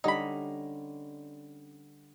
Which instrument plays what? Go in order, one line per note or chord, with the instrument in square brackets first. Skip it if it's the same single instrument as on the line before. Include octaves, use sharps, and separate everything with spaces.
[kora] D3 G3 C#4 [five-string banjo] D#4 B5